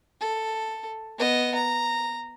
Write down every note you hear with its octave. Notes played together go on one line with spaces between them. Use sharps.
A4
B3 D#5
A#5